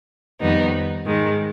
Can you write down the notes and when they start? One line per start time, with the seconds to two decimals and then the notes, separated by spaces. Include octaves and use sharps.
0.40 F2 D#3 G3 B3 D#4
1.05 G#2 D#3 G#3